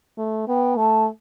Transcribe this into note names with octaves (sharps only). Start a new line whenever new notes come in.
A3
B3 G5
A3 A5